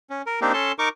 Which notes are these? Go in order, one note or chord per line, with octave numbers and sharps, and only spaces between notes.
C#4
A#4
A#3 C4 D4 D#4 G4
C#4 A4 A5 C6
D#4 A#4 C#6 D6